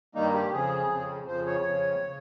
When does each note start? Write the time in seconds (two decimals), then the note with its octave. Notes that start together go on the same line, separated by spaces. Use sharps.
0.15 G2 D#3 G3 A#3 D#4
0.34 G4
0.53 F2 C#3 F3 G#4
0.90 F2 C#3 F3
1.27 F2 C#3 F3 C5
1.47 C#5
1.65 F2 C#3 F3
2.04 C#3